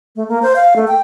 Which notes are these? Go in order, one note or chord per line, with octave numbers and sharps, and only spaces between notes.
A3
A#3
C5
F5
A3
G5